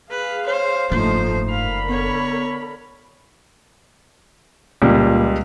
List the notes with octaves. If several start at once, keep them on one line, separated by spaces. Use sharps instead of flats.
G#4 B4 F5
C5 C#5
F#1 G#2 F3 A3 D4 D#4 C5
D3 A#4 F5 B5
B3 C#5
C#2 A#2 G3